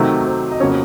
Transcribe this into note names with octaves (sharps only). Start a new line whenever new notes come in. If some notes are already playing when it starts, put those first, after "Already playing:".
Already playing: C3 D#3 F#3 A3
C5
D#5
F2 C#3 F#3 A#3 C#5